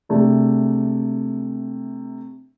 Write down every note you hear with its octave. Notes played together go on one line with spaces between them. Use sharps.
C3 A3 D4 G#4